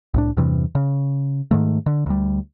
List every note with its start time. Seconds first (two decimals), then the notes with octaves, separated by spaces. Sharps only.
0.14 C2 A2 D4
0.37 E2 G2 C3 E3
0.75 C#3
1.51 G#2 D#3 A3
1.86 D3
2.06 D2 G3